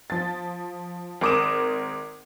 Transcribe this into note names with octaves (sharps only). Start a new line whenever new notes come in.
F3 A6
G#1 A#4 D6 D#6 E7